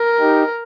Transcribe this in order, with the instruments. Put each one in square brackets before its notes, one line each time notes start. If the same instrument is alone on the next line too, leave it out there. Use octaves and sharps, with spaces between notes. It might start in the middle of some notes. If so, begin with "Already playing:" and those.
Already playing: [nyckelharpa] A#4
[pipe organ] D#4 G4